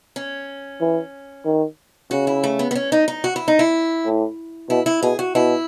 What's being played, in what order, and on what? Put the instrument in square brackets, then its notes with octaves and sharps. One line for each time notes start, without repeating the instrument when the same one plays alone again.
[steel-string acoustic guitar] C#4
[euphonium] E3
D#3
[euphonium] C#3 [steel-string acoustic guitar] F#4
[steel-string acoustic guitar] E4
A3
B3
B3
C#4
D#4
D#4
F#4
E4
D#4
E4
[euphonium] A2
[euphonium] B2 [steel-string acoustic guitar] E4
[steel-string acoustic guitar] E4
[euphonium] B2 [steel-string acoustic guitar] G#4
[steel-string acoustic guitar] F#4
[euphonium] B2 [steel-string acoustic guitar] E4